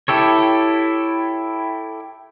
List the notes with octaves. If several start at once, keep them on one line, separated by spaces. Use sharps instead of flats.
E4 G4 A4 C#5